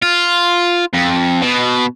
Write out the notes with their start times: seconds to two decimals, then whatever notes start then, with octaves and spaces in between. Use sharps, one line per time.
0.02 F4
0.94 F2
1.42 B2